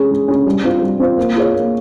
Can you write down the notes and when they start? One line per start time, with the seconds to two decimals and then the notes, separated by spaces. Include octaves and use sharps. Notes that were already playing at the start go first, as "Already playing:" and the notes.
Already playing: G#3 C#4 G#4
0.11 G#3
0.28 C#4 G#4
0.47 G3
0.64 C4 F4 C5
0.82 G3
0.99 C4 F4 C5
1.18 A#3
1.35 F4 G#4 C#5
1.54 A#3